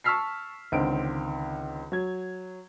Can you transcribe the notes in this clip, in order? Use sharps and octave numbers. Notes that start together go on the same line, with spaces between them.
A5 C#6 E6 F6 B6 C7
C#2 D3 D#3 C4 D7
F#3 G#6